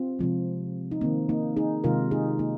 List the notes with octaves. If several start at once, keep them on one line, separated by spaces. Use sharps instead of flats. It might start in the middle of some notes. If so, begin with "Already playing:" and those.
Already playing: C4 F4
C3 F3 G#3
D#4
D#3 A#3 C4
A#3 D#4
D#4 G#4
C3 D#3 G#3 F4 A#4
D#4 G#4
A#3 D#4